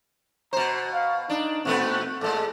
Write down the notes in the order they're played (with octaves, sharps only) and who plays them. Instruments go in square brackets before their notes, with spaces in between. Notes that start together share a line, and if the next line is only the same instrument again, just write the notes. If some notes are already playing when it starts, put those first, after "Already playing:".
[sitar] B2 C5 [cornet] A#5
[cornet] F5
[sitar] D4 [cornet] D#4
[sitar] A#2 A3 B3 [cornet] C4
[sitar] A2 G#3 [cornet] A4